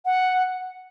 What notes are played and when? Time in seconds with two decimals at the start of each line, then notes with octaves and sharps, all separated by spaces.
0.05 F#5